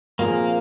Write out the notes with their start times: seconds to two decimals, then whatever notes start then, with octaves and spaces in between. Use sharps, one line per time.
0.19 A#2 F3 A#3 C4 F4 G#4